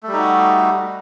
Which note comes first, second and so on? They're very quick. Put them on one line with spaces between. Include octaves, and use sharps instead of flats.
A3 G3 D#4 F#4